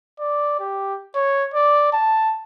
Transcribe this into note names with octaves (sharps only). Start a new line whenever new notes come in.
D5
G4
C#5
D5
A5